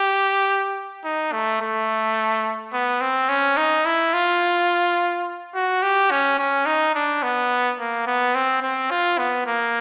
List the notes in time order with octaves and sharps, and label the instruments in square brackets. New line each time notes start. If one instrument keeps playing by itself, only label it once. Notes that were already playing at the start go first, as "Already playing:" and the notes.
Already playing: [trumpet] G4
D#4
A3
A3
B3
C4
C#4
D#4
E4
F4
F#4
G4
C#4
C#4
D#4
D4
B3
A#3
B3
C4
C4
F4
B3
A#3